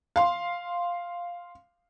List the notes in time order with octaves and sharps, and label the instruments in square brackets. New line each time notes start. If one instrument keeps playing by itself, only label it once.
[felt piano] F5 C6